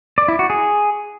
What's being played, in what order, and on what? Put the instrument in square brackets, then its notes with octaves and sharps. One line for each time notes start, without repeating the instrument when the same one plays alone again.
[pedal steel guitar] D5
E4
F#4
G#4